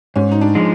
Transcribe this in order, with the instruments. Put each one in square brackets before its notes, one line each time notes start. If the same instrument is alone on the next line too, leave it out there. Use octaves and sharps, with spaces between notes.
[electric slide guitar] G#2 [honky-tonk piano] C#4
[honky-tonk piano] D#4
D4
[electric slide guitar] F3 G#3